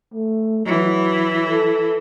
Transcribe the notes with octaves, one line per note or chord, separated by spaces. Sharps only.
A3
E3 F#3
A4